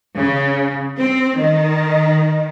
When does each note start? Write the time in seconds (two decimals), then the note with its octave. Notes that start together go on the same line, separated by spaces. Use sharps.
0.16 C#3
0.98 C4
1.36 D#3